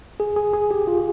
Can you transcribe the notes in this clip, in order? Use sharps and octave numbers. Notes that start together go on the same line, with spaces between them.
G#4
G#4
G#4
G4
F4